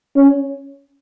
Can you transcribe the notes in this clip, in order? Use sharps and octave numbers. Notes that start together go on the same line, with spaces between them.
C#4